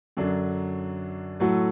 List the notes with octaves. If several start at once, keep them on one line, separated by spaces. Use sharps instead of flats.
F#2 D3 F#3 D4
A2 F#3 A3 F#4 A4